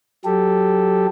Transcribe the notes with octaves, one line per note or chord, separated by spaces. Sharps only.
F#3 G4 A4